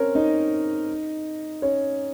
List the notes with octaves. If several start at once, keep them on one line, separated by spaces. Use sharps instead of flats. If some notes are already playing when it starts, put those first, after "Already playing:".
Already playing: C4 C#4 A#4 C#5
D#4 D#5
C#4 C#5